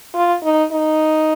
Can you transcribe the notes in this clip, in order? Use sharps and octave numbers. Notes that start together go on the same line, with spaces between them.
F4
D#4
D#4